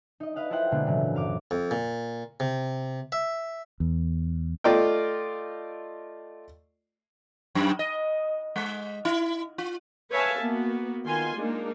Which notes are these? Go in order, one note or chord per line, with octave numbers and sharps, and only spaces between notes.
D#4 D#5
B4 D#5 F5 F#5
E4 F4 A4 C5 F#5 G5
B2 D3 G#3 A#3 B3
A2 C#3 E3 F#3
F#2 F5 D6
F2
A#2
C3
E5
E2
A3 F4 D5 D#5 G5
F#2
D#5
G#3
E4
F4
B4 C#5 E5 F5 G#5 A5
A#3 B3 F#4
D#3 B3 F4 G#5 C6
G#3 A#3 D4 D#4